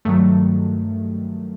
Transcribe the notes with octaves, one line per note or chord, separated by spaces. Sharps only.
G2 D#3 F#3 A3